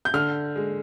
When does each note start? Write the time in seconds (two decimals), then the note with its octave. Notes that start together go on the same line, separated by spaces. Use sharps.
0.05 G6
0.14 D3 F6
0.56 G#3